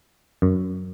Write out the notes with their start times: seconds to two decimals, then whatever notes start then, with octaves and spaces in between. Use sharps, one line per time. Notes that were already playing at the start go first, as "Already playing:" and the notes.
0.42 F#2